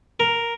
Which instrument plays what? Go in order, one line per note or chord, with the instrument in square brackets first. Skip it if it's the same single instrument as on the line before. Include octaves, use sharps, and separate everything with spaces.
[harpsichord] A#4